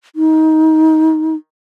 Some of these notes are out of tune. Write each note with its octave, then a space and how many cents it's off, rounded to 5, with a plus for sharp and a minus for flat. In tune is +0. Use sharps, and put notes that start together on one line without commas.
D#4 +20